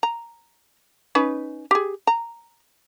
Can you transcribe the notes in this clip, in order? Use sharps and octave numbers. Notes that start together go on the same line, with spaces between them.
A#5
C#4 D#4 B4
G4 G#4
A#5